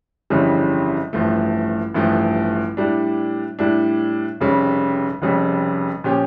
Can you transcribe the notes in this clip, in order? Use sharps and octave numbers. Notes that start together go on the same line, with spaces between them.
G1 F2 C#3 E3 G3
A1 G2 F3 A3
A1 G2 F3 A3
A2 G3 D4
A2 G3 D4
F1 F2 C#3 G3
F1 F2 C#3 G3
A#2 F3 C#4 G4